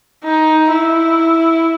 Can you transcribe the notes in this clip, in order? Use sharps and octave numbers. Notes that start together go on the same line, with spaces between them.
D#4
E4